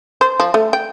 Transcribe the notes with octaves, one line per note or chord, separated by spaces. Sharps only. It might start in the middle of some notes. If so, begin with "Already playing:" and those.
C5
F3
A3
G5